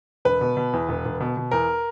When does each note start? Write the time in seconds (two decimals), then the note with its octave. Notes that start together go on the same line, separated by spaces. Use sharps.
0.25 E1 B4
0.41 B2
0.57 B2
0.73 E2
0.89 E1
1.05 E1
1.20 B2
1.37 B2
1.51 E2 A#4